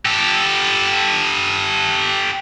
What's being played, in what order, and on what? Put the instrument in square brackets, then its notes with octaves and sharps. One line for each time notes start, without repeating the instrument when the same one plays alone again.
[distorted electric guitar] G4 A4